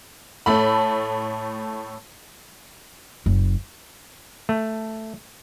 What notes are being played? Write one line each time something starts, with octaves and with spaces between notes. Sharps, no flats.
A2 A3 B5
F#1
A3